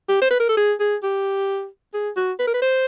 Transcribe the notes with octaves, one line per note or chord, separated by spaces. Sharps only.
G4
C5
B4
A#4
A4
G#4
G#4
G4
G#4
F#4
B4
A#4
B4
C5